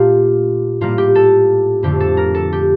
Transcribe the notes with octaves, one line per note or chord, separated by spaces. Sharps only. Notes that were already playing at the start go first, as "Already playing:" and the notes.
Already playing: A#2 A3 F4 G4
A2 G3 A#3 F4
G4
A4
F2 D3 A3 G4
A4
A#4
A4
G4